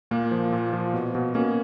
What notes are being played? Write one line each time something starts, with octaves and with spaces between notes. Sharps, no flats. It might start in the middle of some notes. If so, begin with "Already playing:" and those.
A#2 A#3
F3
A#2
F3
B2
B2
B2 A#3 C#4